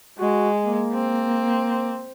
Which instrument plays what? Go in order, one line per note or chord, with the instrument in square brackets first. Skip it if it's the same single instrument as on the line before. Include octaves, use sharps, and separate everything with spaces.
[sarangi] G#3 [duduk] F#4
[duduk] A#3
[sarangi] C4